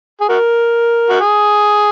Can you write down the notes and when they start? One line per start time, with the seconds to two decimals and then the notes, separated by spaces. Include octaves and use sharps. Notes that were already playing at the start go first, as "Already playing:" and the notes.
0.21 G#4
0.29 F#4 A#4
1.10 F#4
1.20 G#4